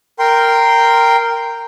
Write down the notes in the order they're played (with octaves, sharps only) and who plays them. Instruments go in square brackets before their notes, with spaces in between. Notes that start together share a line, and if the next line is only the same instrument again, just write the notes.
[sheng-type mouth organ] A#4 G5 C6